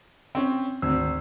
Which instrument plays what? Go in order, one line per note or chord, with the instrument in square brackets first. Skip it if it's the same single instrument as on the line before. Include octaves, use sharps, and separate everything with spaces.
[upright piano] C4 C#4
[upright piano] G#1 [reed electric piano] D2 C4 E6